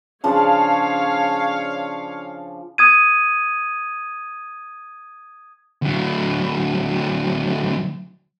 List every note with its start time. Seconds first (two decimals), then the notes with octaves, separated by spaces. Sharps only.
0.24 C#3 F3 D4 C#5 F5
2.78 D#6 G#6 D#7
5.82 D2 F#3